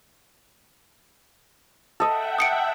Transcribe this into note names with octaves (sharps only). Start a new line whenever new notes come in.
A4 D#5 E5 F#5 G5
D#6 C#7 D7